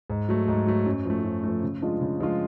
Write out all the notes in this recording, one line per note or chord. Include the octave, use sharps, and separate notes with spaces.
G#2
F#3 A3
G#2
F#3 A3
F#2
F3 A3
F#2
F3 A3
C#3
F3 G#3 D4 F4
C#3
F3 G#3 D4 F4